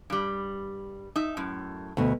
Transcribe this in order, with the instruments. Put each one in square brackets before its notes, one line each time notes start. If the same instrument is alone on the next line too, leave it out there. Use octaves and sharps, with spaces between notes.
[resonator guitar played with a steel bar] G2 G3
D#4 E5
F#2 A2
[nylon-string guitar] D2 B2